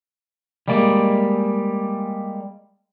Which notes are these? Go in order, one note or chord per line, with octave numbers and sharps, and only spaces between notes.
G3 G#3 A#3 D5